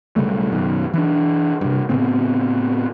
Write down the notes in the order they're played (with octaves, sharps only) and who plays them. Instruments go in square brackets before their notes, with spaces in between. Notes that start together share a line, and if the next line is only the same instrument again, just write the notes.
[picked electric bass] B1 C#3 G3 A3
F#2 B2 D#3
E3 D4
G2 C3
A2 C#3 B3 C4